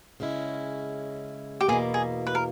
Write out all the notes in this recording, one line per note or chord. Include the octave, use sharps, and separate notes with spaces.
C#3 G#3 C#4 E4
G4
E2 B2 A#3 G#4
G#4
B4
A#4